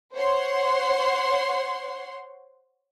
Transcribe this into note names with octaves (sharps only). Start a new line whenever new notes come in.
C5 C#5 F#5 C6